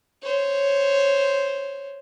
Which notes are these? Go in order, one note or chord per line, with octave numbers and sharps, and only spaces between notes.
C5 C#5